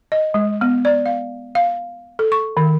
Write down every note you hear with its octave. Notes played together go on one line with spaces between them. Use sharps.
D#5
G#3
B3
D5
F5
F5
A4
C#6
D#3